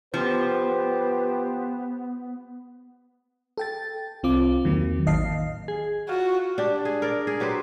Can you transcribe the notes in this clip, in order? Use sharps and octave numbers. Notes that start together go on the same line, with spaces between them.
F3 B3 G4 B4 C5
A4 G5 A6
C2 C4 F4 D6
E2 D#3 F#3 A#3
A1 D#3 D#5 F5 A5 C7
G#4
F4 F#4
D4 G4
G#4
A#4 D5
G#4
F#3 G4 B4 C5